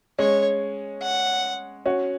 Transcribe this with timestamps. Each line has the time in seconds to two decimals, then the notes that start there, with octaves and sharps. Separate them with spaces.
0.19 G#3 C#4 C#5
1.02 F#5
1.86 C#4 F#4